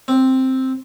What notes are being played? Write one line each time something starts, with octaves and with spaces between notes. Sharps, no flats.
C4